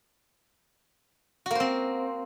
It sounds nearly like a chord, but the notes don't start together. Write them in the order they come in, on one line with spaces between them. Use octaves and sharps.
F#4 A#3 C5 C4